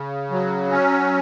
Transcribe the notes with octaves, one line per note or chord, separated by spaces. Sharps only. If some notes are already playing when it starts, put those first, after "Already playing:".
Already playing: C#3
F#3
C#4